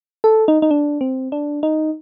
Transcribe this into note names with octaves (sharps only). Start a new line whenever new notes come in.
A4
D#4
D#4
D4
C4
D4
D#4